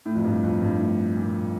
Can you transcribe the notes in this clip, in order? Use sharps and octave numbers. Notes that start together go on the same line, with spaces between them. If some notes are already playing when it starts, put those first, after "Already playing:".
A2
F2
G2
F2
G2
A2
A#2